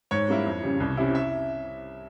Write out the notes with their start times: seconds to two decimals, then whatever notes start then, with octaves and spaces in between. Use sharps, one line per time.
0.11 G#2 C#5
0.28 G3 A#3 E4
0.46 F2
0.63 C#3 G3
0.80 C2
0.97 C3 G3 C#4 E4
1.15 E5